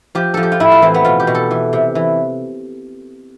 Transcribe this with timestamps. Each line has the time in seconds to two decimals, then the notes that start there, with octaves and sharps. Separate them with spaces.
0.15 F3 G4
0.34 F3 A4
0.43 G4
0.52 F4
0.60 A2 E4
0.72 F4
0.82 E3 C4
0.94 B3
1.04 B2 F4
1.20 G4
1.27 B2
1.35 A4
1.51 E3
1.73 C3
1.95 E3